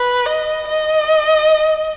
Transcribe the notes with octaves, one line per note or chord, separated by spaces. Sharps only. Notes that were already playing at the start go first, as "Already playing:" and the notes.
Already playing: B4
D#5
D#5